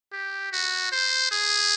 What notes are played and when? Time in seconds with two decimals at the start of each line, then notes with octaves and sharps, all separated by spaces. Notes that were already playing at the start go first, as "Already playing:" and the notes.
0.12 G4
0.53 F#4
0.92 C5
1.32 G#4